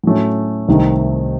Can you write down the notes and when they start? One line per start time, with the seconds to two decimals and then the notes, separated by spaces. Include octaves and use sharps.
0.04 A2 F#3 A3 C#4
0.68 C2 C3 D#3 A3 D#4